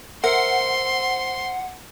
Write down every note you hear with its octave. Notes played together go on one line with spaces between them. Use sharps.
A#4 C5 E5 F#5 C6